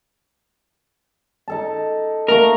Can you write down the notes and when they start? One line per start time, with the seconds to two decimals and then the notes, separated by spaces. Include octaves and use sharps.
1.48 D#4 A4 A5
2.28 A3 A#3 D#4 A#4